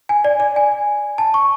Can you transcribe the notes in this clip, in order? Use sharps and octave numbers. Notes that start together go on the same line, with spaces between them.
G#5
D5
D5
G#5
A5
C#6